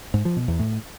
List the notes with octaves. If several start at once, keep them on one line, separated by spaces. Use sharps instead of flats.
G#2
F3
B2
E2
A2